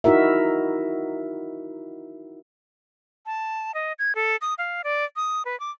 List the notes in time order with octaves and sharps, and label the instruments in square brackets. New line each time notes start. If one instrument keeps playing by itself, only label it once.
[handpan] D#4 E4 F#4 A#4 E5
[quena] A5
D#5
G#6
A4
D#6
F5
D5
D#6
B4
D6